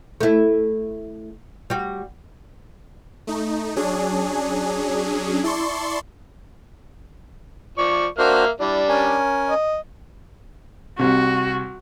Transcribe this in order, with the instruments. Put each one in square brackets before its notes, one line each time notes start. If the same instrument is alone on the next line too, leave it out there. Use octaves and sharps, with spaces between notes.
[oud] A3 E4
G3 F#4
[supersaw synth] A3 D#4
F#3 C#4 D4 G#4
E4 D5 A5 C6 C#6
[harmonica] F3 D5 C#6
[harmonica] A#3 E5 F6 [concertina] D4 F#4 C5
[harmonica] G3 D4 [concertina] E4
[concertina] C#4 A#4 G#5
[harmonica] D#5
[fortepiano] C2 C3 G3 [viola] F#4